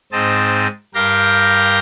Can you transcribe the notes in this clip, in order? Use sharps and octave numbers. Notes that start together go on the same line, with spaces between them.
G#2 C4 D#5 A5
G2 G4 A#4 F5 G6 A#6